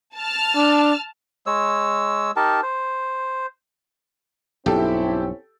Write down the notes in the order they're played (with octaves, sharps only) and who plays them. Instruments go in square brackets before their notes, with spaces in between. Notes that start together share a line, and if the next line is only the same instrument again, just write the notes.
[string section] A5 F6
[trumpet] D4
[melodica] G#3 C#5 E6
D#4 G4 A#4 A5
C5
[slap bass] B1 G2 [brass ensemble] C4 C#4 E4 [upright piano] G4 A4